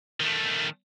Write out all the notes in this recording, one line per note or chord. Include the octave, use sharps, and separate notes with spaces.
D#3 A3